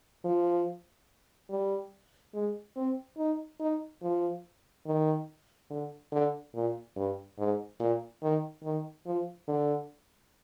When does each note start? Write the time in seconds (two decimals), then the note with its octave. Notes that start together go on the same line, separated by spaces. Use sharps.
0.24 F3
1.50 G3
2.34 G#3
2.76 C4
3.18 D#4
3.60 D#4
4.02 F3
4.86 D#3
5.70 D3
6.12 D3
6.55 A#2
6.96 G2
7.39 G#2
7.80 A#2
8.23 D#3
8.63 D#3
9.07 F3
9.48 D3